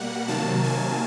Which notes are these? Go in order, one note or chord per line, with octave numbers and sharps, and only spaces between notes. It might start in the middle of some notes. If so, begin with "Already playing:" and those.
Already playing: B2 G3 A#3 F#5
C3 D#3 F#3 A#3 A5
G#5